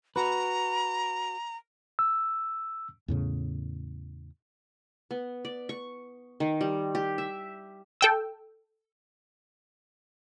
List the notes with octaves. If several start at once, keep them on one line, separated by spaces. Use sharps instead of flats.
F#4 B4 A#5
E6
E2 A2 C#3
B3
D5
C#6
D#3
G3
G4
E5
A4 G5 E6